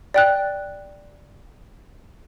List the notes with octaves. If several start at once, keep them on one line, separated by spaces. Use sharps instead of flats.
D5 G5 F#6